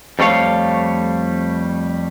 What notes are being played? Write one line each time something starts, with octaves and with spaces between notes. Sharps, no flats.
F2 G3 A3 C#5 F5